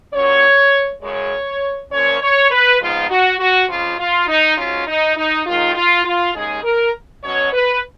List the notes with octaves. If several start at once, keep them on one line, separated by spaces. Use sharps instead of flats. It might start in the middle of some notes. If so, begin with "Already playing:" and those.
A#2 F#3 C#4 C#5
F#2 C#3 G#3 C#5
A#2 F3 A#3 C#4 C#5
C#5
B4
F2 F3 G#3 B3 D#4 F4
F#4
F#4
F2 C#3 F3 F4
F4
D#4
G#2 F#3 C#4 F4
D#4
D#4
D#2 D#3 G#3 D#4 F4
F4
F4
D#2 C#3 G#3 D#4 G#4
A#4
B2 F#3 C#4 C#5
B4